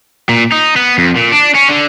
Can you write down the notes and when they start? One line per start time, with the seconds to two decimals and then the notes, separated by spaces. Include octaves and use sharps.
0.29 A#2
0.52 D#4
0.76 B3
0.98 F2
1.16 A#2
1.33 D4
1.55 C#4
1.69 D3